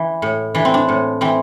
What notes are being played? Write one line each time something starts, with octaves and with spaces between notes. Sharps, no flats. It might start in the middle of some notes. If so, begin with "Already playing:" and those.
Already playing: E3
A2
E3 D4
C4
D4
A2
E3 C4